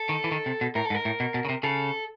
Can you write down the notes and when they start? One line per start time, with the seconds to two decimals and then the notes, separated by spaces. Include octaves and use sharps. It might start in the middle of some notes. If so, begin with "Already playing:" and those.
Already playing: A4
0.09 D#3
0.24 E3
0.32 D#3
0.46 C3
0.61 B2
0.75 A2 A#4
0.85 A4
0.90 G#2
0.94 A#4
1.05 A2
1.20 B2
1.34 B2
1.45 C#3
1.49 C3
1.63 C#3 A4